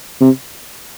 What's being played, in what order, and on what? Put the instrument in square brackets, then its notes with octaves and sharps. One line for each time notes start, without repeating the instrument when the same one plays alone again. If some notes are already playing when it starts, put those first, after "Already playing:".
[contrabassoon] C3